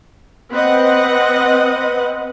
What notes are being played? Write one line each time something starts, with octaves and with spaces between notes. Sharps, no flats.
C4 B4 D#5 F#5